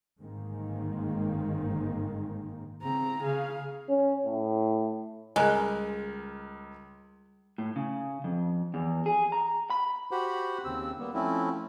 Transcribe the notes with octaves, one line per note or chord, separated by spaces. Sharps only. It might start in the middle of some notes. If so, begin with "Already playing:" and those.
G1 G#2 D#3 G#3 A#3 C4
C#3 C4 A#5
C#3 G#4 F5
C#4
A2
C#2 G3 G#3 G#4 A#4 F#6
A2
C#3
F2
E2
G#4
A#5
B5
F#4 G4 C5 F#5 B5
D#2 C#3 C4 E6
G3 A#3 B3
F3 A3 C4 C#4 E4